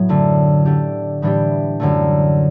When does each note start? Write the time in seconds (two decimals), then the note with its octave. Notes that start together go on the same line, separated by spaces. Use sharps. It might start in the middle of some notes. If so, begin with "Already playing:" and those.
Already playing: A2 F#3 B3
0.09 F#2 D3 A3
0.65 D3 A3 D4 G4
1.22 A2 E3 G3 D4 G4
1.80 F#2 D3 A3